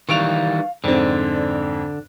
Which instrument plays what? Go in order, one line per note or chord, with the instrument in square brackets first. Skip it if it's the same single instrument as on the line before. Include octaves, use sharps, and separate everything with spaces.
[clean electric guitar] D#3 E3 G3 [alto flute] F5 [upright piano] C#6 D7 F7
[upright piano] F2 G#2 C4 [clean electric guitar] D3 [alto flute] D5